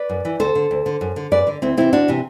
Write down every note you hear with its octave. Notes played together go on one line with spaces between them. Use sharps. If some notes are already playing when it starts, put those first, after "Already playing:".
Already playing: B4 D5
F#2
E3
D2 A4 C5
D3
D2
D3
F#2
D3
F#2 B4 D5
D3
D2 C4 E4
C3 E3 C4 E4
D2 D4 F#4
C3 E3